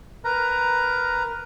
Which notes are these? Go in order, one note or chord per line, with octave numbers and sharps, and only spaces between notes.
A#4 B4 A#5